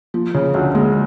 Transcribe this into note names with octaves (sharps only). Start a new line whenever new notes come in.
F3
C#3
D2
G#3